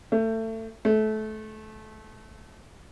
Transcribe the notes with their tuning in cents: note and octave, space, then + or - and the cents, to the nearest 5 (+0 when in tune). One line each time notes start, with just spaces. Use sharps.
A3 +25
A3 -25